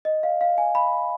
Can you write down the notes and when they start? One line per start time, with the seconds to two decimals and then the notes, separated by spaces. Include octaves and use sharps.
0.05 D#5
0.23 F5
0.41 F5
0.58 G#5
0.75 B5